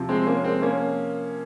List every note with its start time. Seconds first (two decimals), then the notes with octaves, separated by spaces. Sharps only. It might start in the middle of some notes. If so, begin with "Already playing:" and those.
Already playing: C3 F3
0.09 G#3 C4
0.26 A#3 C#4
0.44 G#3 C4
0.62 A#3 C#4